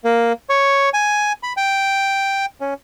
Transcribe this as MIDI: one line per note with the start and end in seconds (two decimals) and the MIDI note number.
0.05 0.32 58
0.49 0.89 73
0.94 1.32 80
1.43 1.53 83
1.57 2.45 79
2.61 2.74 61